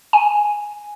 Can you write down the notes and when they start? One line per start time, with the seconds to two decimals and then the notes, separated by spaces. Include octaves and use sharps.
0.13 G#5